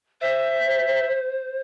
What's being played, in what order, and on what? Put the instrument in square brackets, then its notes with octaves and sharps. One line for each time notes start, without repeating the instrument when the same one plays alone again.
[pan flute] C5 [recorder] E5